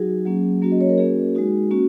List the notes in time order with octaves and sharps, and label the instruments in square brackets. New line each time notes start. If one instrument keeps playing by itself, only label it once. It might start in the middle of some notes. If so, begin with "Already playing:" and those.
Already playing: [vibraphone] F#3 D#4 F#4 G#4
F#3 A#3 C#4
F#3 A#3 C#4 F#4
D#5
C#5
A#4
A#3 C#4 F#4 G#4
G#3 D#4 F#4
A#3 C#4 F#4